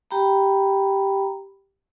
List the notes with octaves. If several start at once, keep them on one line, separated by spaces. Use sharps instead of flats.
G4 G5 A#5 B5